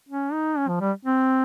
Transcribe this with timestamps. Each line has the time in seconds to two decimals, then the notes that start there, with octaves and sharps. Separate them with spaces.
0.09 C#4
0.33 D#4
0.58 C#4
0.68 F3
0.81 G3
1.05 C4